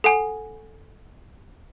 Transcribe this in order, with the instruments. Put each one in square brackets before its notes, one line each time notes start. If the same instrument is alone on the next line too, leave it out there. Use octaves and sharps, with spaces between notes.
[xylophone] A4 F#5 G#5